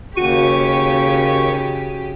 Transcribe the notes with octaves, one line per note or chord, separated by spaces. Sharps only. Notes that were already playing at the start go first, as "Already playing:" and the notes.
D#2 C#3 F#4 G4 C#6 D#7